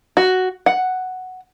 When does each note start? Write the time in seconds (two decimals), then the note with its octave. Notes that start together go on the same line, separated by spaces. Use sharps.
0.17 F#4
0.66 F#5